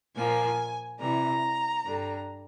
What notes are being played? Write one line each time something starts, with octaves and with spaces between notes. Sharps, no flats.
A#2 F3 A#3 G#5
C3 E3 G3 A#5
G2 D3 G3